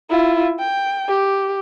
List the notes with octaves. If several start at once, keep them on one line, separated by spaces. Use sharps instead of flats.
E4 F4
G5
G4